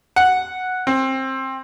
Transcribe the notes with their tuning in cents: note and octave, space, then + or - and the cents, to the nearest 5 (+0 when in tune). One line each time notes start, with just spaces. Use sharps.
F#5 -5
C4 +20